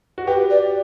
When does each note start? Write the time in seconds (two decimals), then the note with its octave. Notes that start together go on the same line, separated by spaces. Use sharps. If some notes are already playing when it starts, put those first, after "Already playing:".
0.18 F#4
0.27 G4 B4
0.50 D5